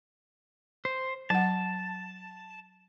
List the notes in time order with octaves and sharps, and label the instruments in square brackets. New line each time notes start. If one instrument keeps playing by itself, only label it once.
[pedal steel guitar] C5
[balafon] F#3 F#5 [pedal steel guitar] A5